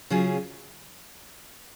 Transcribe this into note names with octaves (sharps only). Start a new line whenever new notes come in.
C#3 F#3 C#4 F4 G#4